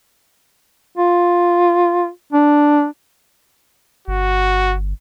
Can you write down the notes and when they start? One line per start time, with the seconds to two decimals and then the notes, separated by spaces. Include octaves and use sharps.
0.98 F4
2.32 D4
4.08 G1 F#4